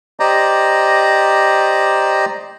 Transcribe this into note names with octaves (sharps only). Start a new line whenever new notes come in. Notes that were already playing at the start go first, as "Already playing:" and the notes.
G4 C5 D5 D#5 A#5